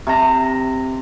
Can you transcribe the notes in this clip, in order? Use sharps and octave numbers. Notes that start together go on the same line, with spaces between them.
C3 A5 A#5